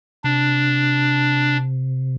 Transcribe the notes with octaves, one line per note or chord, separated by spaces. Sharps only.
C3 D4